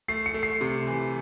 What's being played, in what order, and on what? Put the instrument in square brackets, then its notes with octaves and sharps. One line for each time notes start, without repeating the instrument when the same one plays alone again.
[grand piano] A3 C7
C#7
A3
C7
C3
E3